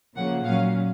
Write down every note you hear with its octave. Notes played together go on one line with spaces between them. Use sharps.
C#3 F3 A#3 F#5
A#2 F#3 C#4 F5